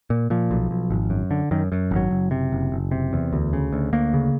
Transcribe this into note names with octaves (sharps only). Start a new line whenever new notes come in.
A#2
A#2 F3
B1
B1
G#1
F#2
D3
F#2 D#3
F#2
G#1
F#3
F#1
C3
F#1
F#1
C3
E2
D2
C#3
D2
D2 A#3
C#3